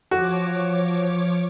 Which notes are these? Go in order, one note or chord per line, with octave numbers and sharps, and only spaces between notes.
F3 F#4 C#5 D6